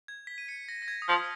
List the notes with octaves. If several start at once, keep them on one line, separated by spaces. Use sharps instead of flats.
G#6
B6
D#7
C#7
A#6
A#6
G#6
D#6
F3 F6